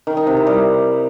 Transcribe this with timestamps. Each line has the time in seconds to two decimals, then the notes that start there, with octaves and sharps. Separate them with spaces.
0.07 D#3
0.17 D#4
0.27 C3
0.37 E4
0.47 G3